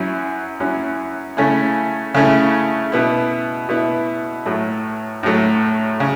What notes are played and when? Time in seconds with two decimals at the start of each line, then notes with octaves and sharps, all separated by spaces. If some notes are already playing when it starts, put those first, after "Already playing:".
Already playing: F#2 F#3 C#4 E4
0.60 F#2 F#3 C#4 E4
1.37 C#3 A3 C#4 E4
2.14 C#3 A3 C#4 E4
2.92 B2 B3 E4
3.69 B2 B3 E4
4.46 A2 F#3 A3
5.23 A2 F#3 A3
6.00 C#3